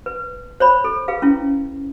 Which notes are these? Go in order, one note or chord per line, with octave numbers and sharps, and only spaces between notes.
B4
C5 C#5 B5
A4
G#4 B4 F5
C#4 E4